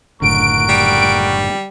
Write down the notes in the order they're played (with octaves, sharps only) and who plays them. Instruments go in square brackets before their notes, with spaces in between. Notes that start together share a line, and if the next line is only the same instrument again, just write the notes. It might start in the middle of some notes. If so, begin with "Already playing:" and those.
[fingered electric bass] F#1 A2 D3 [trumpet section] A#4 F#5 C#6 [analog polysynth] D7
[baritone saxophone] G3